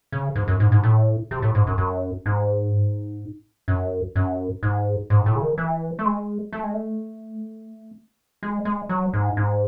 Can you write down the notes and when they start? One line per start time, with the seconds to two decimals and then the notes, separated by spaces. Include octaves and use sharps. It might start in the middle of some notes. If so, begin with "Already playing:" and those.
0.12 C#3
0.35 G#2
0.48 F#2
0.60 G#2
0.72 G#2
0.83 A2
1.31 C3
1.42 A2
1.55 G#2
1.67 F#2
1.78 F#2
2.26 G#2
3.68 F#2
4.16 F#2
4.63 G#2
5.10 G#2
5.26 A2
5.35 C#3
5.42 D#3
5.58 E3
5.99 A3
6.05 G#3
6.53 A3
6.63 G#3
6.74 A3
8.43 G#3
8.65 G#3
8.89 F#3
9.13 G#2
9.37 G#2